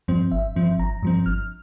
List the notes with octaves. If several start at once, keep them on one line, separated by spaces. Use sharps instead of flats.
G2 F3 C4
G1 E5
G2 F3 C4
G1 A#5
G2 F3 C4
G1 F6